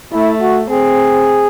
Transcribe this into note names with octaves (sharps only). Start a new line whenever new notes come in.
A3 E4
F#4
C4 G#4